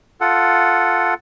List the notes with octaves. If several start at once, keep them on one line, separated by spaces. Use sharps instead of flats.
F4 A4 F#5